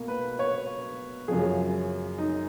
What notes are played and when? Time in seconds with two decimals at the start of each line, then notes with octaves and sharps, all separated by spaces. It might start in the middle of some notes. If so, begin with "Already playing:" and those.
Already playing: B2 A#3
0.08 B4
0.39 C#5
1.28 F#2 C#3 F3 G#4
2.18 D#4